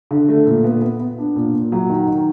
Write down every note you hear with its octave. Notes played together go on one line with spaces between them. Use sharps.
D3
A3
A#2
B3
B3
B3
D4
A#2
A#2
F#3
D#3
D#3